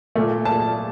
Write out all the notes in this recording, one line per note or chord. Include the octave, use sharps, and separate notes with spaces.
A#2 A3
A5